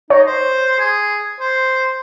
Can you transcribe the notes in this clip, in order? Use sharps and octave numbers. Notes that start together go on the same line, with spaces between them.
D#4 C#5
C5
G#4
C5